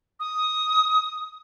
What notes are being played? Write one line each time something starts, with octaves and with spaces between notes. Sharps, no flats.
D#6